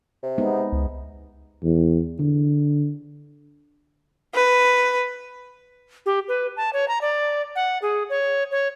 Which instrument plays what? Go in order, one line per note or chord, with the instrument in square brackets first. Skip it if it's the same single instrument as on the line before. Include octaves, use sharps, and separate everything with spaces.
[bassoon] C3
[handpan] G#3 B3 D#4
[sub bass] C#2
[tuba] E2
D3
[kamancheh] B4
[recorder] G4
B4
A5
C#5
A#5
D5
F#5
G#4
C#5
C#5